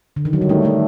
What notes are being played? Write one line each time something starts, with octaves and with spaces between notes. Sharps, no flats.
D3
D#3
F#3
G3
D#3 A3
A3